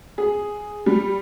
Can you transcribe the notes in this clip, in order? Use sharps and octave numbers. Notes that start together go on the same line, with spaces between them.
G#4
G3